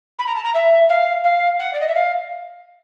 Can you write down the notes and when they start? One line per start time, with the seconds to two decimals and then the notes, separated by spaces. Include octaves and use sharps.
0.19 B5
0.26 A#5
0.35 A5
0.43 A#5
0.54 E5
0.89 F5
1.24 F5
1.59 F#5
1.73 D5
1.81 D#5
1.88 E5
1.95 F5